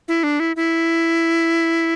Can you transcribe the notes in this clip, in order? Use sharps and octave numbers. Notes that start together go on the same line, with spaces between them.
E4
D4
E4
E4